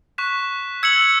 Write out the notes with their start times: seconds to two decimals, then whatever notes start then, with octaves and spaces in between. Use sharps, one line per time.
0.18 C#6 F#6 B6 E7
0.83 E6 G#6 C#7 F#7